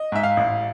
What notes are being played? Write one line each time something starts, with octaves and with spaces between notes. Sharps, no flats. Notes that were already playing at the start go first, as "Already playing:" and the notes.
Already playing: D#5
G#2 E5
F5
A1